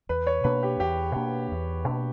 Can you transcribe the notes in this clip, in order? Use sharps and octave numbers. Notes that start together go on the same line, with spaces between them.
E2 B4
C#5
B2 A#3 D4 B4
G4
E2 G4
B2 A#3 D4
E2
B2 A#3 D4